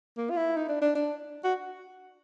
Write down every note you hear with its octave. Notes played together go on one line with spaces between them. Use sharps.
A#3
F4
E4
D#4
D4
D4
D4
F#4